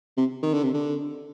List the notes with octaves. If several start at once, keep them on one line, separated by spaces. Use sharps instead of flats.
C3
D#3
D3
C3
D3